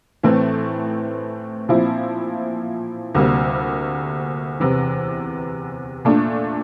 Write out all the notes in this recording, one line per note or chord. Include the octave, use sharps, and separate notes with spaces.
A2 E3 A3 C4
A#2 F3 C4 E4
D2 C3 G3 A#3
E2 C3 E3
A#2 A3 D4